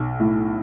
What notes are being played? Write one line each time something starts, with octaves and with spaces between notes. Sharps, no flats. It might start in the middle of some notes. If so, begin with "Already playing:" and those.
Already playing: B1
A2